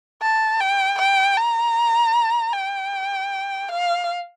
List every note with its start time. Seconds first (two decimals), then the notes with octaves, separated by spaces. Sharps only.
0.22 A5
0.61 G5
0.99 G5
1.37 A#5
2.53 G5
3.69 F5